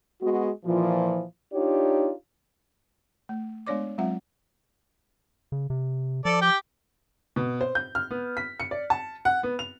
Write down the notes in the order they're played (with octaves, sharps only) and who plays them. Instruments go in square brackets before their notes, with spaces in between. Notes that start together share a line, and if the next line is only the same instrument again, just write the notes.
[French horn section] G#3 B3 F#4
A#2 E3 F3
D4 D#4 F4 G4 C#5
[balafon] A3
G#3 B3 D4 C#5 D5 D6
F#3 G#3 C4 F4 E5 F#5
[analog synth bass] C#3
C3
[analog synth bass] F3 [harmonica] A4 D5
[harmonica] G4 G5
[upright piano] B2
C5
G6
F6
B3
B6
C#7
D5
A5
F#5
B3
F7